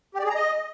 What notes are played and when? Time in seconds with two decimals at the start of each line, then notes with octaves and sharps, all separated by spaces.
0.15 G4
0.20 D5
0.25 G#4
0.30 A#5
0.35 D#5